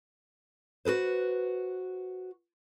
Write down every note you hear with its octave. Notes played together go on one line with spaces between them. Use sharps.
F#4 A4 B4 C5